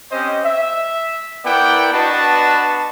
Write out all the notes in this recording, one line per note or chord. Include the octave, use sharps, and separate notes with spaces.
C4 C#4 G4 C5 D#5
E5
B3 E4 A#4 D5 F#5 G5
B3 D4 F#4 B4 D#5 A5